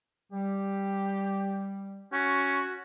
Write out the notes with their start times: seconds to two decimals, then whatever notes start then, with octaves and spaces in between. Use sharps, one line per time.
0.33 G3 G4
2.13 C#4 F#4